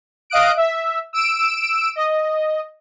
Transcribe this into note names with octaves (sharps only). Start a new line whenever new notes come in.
D#5 F5 D#6 F#6 D7
E5
E6 D7 E7
D#5